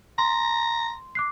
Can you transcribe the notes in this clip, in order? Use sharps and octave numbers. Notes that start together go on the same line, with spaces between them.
A#5 C6
D6 F#6 C7